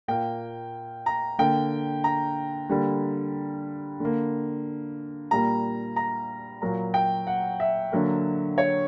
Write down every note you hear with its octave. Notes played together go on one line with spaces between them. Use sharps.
A#2 A#3 G5
A#5
D3 A#3 G5
A#5
D3 G3 A#3
D3 A#3
A#2 G3 A#3 A#5
A#5
A#2 F#3 A#3 A#5
G5
F#5
E5
D3 F#3 A#3
C#5